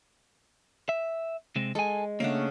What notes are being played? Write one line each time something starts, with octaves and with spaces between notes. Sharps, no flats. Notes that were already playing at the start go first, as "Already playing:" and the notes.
E5
C3 G#3 C4
G#3 A4 G#5
C#3 A3 A#3 D4 F#5